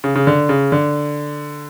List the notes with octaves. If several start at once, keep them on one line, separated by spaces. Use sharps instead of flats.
C#3
C#3
D3
C#3
D3